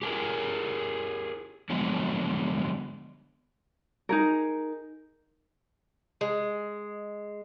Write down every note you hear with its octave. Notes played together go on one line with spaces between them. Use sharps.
G4 G#4 A#4
D3 F3 F#3 G#3 A3 B3
D#4 G#4 A#4
G#3